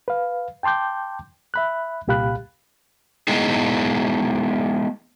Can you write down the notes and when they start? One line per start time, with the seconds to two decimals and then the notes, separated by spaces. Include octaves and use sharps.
0.08 B4 F5
0.63 G5 A5 C6 D6 G6
1.54 E5 B5 F#6
2.08 C2 A#2 G4 F5 B5 F#6
3.28 G#3 B3 D#4 E4 G#4